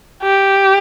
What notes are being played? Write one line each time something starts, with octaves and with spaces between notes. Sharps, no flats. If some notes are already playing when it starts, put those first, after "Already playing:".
G4